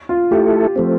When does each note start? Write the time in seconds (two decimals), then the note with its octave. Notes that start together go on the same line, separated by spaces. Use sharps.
0.09 F4
0.31 A3 E4 G4 A4
0.76 F3 A3 C4